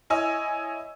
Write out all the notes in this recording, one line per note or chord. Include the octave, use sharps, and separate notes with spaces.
E4 C#5 D#5 G#5 E6